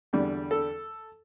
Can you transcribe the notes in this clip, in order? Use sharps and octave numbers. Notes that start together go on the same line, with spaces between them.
E2 D3 G3
A4